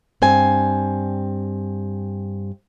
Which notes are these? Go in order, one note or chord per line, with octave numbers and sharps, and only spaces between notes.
G2 C4 G#5